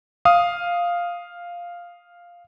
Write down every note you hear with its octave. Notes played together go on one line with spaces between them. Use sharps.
F5 D#6